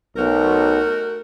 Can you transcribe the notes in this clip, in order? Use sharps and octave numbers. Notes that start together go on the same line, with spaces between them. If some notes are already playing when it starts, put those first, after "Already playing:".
B1 A3 F#4 A#4